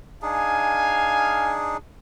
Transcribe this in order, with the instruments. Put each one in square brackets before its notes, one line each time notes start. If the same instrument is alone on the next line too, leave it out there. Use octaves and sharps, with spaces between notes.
[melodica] D4 D#4 G#4 [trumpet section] F5 G#5